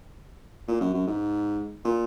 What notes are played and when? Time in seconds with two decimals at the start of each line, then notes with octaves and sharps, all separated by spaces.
0.68 A#2
0.81 F#2
0.94 F#2
1.07 G#2
1.85 A#2